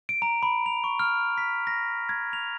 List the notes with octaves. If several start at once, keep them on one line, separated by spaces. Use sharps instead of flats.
D7
A#5
B5
F7
C#6
F6
B6
A#6
G#6
F7